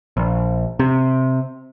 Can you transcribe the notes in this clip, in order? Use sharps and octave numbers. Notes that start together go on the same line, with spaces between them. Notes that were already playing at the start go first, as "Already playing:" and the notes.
A#1
C3